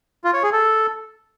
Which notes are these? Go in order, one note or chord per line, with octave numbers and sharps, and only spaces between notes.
F4
C#5
G#4
A4